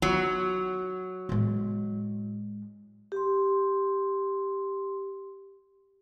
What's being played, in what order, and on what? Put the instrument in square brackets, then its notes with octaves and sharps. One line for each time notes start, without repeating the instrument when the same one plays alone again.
[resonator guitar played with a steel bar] F#3 [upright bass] D#4 F4
[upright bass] A2 G#3
[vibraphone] G4 C6